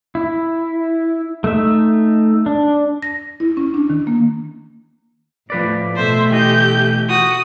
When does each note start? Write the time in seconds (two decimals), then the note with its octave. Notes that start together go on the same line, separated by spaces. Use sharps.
0.15 E4
1.44 A3 D#4 E5
2.46 D4
3.02 A#6
3.40 E4
3.57 C#4
3.74 D4
3.90 D#3
4.07 A#3
5.50 A2 F3 B4 D5
5.97 B2 A3 C5 E5
6.31 E3 G4 D#5 G6
7.09 F#4 D#6